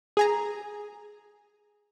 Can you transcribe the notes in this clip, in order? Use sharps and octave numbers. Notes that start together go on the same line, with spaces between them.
G#4 G#5 A#5